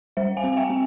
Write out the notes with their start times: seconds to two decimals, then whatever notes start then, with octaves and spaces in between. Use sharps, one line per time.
0.17 G3 C5 E5
0.37 F5 G#5
0.44 C4
0.57 E5 G5
0.70 C4